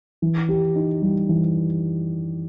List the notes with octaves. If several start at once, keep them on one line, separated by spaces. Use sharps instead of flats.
E3
G4
D#4
G3
E3